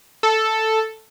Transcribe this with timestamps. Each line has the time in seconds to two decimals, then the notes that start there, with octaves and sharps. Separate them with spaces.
0.23 A4